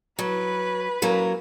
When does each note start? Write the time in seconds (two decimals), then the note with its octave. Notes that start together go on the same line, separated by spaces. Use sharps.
0.19 F#3 B4
1.02 F#3 A#3 C#4